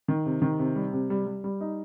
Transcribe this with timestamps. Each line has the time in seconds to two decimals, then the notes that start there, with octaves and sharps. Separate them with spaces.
0.08 D#3
0.26 C3
0.42 D#3
0.59 C3
0.75 G3
0.93 C3
1.10 G3
1.27 G3
1.44 G3
1.61 D#4